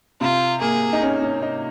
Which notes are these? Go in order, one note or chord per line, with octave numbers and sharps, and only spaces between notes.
C3 F4
A#3 G#4
D#4
C#4
C#4
D#4